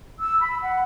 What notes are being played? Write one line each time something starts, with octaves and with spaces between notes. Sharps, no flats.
E6
B5
F#5